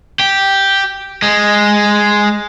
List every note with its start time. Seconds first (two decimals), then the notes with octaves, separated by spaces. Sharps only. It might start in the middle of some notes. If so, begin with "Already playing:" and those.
0.20 G4
1.22 G#3